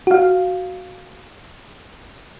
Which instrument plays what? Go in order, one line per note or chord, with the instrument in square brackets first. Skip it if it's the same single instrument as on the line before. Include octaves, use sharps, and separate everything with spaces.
[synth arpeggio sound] F#4 F5